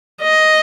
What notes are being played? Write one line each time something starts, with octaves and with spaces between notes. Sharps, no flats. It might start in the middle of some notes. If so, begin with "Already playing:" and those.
D#5